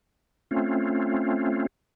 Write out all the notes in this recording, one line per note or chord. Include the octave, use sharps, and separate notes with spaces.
A3 C4 C#4 F4